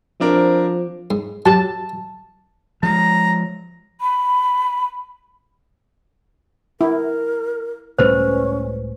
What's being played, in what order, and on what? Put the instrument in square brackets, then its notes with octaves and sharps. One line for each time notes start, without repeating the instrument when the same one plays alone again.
[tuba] F3 [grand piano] C4 D4 A#4
[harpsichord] G#2
[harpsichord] F#3 G4 [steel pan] A5
[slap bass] F3 G#3 [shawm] A#5
[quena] B5
[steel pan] E4 [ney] A#4
[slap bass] C#2 A2 G3 [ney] C#4 [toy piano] B4 C5